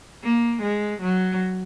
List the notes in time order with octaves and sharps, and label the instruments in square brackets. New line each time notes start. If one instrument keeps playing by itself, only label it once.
[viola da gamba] A#3
G#3
F#3